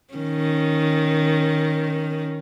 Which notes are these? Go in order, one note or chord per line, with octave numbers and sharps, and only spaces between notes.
D#3 C#4